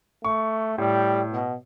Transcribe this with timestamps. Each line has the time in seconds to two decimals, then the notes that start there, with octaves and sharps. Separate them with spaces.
0.25 A3 C#6
0.78 A2 G3
1.32 B2